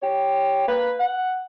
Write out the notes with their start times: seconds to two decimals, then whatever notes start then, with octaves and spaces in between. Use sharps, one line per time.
0.02 G4 C#5
0.67 A#3 B4
0.99 F#5